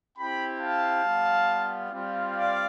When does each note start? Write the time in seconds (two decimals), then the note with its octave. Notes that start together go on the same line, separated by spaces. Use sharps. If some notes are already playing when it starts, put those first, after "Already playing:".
0.17 C4 E4 G4 G5 B5
0.59 F5 A5
1.03 G3 B3 F4
1.90 G3 C4 F4
2.35 D5 F5